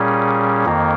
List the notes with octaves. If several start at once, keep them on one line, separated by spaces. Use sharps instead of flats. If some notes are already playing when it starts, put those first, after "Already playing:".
Already playing: A#2 G3 C#4 G#4
F2 D#3 A#3